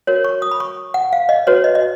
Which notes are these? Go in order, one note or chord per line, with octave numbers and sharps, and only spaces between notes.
F#4 A#4 C#5
C#6
D#6
B5
C#6
F#5
F5
D#5
F#4 B4 C#5
D#5
D#5